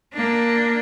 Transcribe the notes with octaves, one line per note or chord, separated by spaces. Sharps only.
A#3 D4